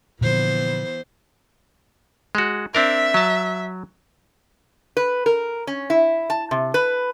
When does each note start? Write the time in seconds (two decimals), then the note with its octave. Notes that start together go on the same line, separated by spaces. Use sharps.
0.21 A#2 D3 E3 F3 B3 C5
2.35 G#3 F#4
2.75 C4 D4 A#4 E5
3.14 F#3 A5
4.97 B4
5.26 A#4
5.67 C#4
5.90 E4
6.30 A5
6.51 C3
6.74 B4